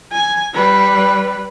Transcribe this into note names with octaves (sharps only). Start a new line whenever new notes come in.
G#5
G3 B4